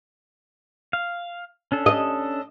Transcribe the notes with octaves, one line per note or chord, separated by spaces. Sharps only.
F5
C#4 D4 A4
D#5